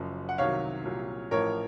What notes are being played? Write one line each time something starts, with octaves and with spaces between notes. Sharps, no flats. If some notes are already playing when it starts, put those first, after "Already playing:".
Already playing: F#1 F#2 F3
F#5
C2 C3 D#3 F#3 C#5 F5
C2 A#2 F#3
A1 A2 F3 A#4 C#5